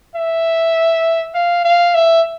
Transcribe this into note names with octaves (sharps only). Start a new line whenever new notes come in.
E5
F5
F5
E5